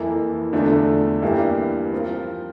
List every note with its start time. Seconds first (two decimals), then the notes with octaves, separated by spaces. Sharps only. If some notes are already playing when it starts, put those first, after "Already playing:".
Already playing: F2 E3 A#3 E4 A4
0.52 E2 D3 F3 A3 D4
1.22 G2 E3 A#3 E4 G4
1.92 F3 C4 F4 A#4